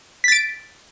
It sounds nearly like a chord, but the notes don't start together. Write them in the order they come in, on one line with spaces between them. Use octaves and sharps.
B6 A6 D7